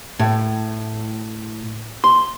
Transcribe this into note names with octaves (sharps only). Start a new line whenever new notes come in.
A2
C6